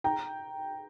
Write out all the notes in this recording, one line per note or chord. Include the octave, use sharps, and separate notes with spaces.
G5 A#5